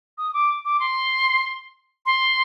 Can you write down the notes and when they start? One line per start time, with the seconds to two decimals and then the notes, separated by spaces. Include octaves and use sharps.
0.18 D#6
0.34 D6
0.65 D6
0.80 C6
2.06 C6